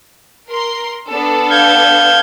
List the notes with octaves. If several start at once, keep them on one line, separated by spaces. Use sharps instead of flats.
A#4 C6
B3 D4 A4
F5 G6 G#6